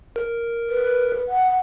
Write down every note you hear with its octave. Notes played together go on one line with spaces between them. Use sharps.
A#4
B4
F#5